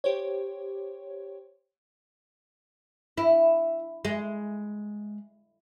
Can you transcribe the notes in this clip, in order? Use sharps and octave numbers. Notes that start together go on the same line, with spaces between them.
G4 C5 C#5
E4
G#3